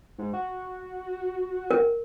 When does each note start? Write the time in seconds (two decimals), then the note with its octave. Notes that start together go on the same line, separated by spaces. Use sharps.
0.18 G#2
0.33 F#4
1.71 A#4